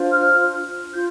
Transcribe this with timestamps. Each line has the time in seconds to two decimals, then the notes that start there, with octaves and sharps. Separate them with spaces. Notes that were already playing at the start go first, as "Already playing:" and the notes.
Already playing: D4 F4 C5
0.12 F6
0.94 F4 G6